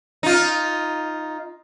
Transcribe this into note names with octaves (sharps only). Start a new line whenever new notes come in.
D#4 F4